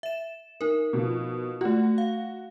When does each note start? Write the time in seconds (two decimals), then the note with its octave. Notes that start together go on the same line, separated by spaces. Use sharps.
0.03 E5 E7
0.61 D#4 A#4
0.93 B2 F3
1.61 A3 F4 F#4
1.98 F5